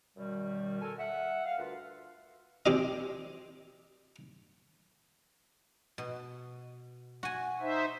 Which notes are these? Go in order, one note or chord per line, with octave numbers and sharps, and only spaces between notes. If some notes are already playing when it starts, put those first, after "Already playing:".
F#2 B2 D#3 G3
A4 A#4 G#5
E5 F#5
F5
D2 F4 A#4 B4
C4 G4 D#5
B2
F#4 G#5
D#4 C5 E5